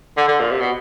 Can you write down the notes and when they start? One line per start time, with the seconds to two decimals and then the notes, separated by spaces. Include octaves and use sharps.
0.17 D3
0.28 D3
0.40 A#2
0.51 C3
0.61 B2